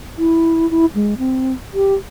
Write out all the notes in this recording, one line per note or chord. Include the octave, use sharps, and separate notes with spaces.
E4
E4
G#3
C4
G4